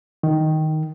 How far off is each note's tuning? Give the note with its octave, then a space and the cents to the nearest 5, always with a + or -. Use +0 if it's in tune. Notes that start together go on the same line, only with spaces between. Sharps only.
D#3 +5